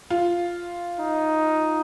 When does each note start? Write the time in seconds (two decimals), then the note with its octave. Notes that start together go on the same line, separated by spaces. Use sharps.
0.10 F4
1.00 D#4